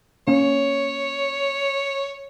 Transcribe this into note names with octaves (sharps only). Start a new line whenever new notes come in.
A#3 C#4 C#5